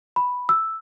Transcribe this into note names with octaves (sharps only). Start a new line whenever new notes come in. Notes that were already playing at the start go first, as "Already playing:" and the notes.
B5
E6